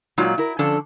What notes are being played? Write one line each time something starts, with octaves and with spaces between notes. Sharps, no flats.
A#2 F#3 G#3 D#4 F4 D5
E4 A#4
D3 F3 C#4 D4 A4